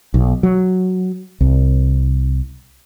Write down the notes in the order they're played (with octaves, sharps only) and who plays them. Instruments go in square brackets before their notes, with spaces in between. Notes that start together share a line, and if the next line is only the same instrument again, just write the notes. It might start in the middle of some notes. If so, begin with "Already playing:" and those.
[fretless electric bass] B1
F#3
C2